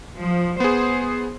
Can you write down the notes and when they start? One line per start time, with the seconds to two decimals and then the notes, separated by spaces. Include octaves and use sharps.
0.17 F3
0.60 B3 G#4 C5